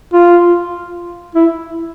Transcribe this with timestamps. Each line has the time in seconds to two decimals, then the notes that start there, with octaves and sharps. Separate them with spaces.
0.13 F4
1.35 E4